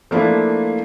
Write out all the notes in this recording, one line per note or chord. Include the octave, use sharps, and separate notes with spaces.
F3 A3 A#3 D4 E4